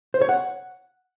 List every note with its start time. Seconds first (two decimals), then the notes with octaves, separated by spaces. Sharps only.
0.14 C5
0.22 C#5
0.29 F#5